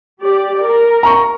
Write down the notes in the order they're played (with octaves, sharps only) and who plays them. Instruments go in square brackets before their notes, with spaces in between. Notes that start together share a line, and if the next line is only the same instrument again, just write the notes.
[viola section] G4 D5
A#4
[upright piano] A#5 C#6